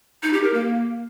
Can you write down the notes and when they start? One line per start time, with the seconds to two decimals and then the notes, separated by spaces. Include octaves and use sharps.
0.23 D#4
0.33 G4
0.43 A#4
0.54 A#3